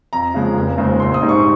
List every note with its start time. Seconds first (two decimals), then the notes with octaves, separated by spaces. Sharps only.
0.13 F2 A#5
0.34 C#3 F3 G#3
0.56 F1
0.78 D#2 C#3 G#3 C4
1.00 A#1 C6
1.14 D#6
1.21 G#2 G3 C4 D#4
1.29 C#6